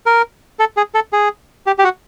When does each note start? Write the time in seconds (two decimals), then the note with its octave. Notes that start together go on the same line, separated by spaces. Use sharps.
0.06 A#4
0.59 A4
0.77 G#4
0.94 A4
1.13 G#4
1.66 G4
1.79 G4
1.84 F#4